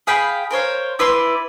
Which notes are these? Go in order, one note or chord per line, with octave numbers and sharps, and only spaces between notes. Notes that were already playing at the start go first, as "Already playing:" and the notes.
G#4 F5 G5 B5
A#4 C5 C#5 F5
E4 B4 D5 C6